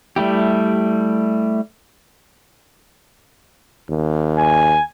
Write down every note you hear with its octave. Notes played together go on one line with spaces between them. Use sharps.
G3 A3 E4 G4
D#2
G#5